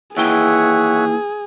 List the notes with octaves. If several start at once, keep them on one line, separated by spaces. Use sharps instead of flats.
D#2 E3 G#4 C#5 E5 F#5 G5